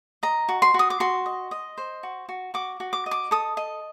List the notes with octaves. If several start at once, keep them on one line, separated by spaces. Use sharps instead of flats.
D#5 A#5
F#4
C6
F#4
D#6
D6
F#4 C6
D#5
D#5
C5
F#4
F#4
F#4 D6
F#4
D6
D#5
D6
A4 D#6
D#5